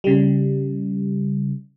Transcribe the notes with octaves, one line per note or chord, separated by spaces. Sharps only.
C#3 G3